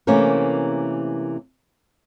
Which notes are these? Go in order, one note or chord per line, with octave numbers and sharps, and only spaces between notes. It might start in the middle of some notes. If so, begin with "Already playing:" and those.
C3 E3 A3 A#3 C#4 A#4